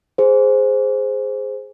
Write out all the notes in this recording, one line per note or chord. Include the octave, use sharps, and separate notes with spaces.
G#4 C5